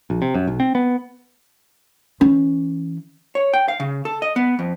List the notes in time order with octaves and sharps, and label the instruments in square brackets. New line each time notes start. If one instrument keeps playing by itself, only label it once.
[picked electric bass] A#1
C3
F#2
B1
C4
B3
[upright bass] E3 C#4
[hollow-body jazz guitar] C#5
G5
F5
C#3
A4
D#5
B3
F2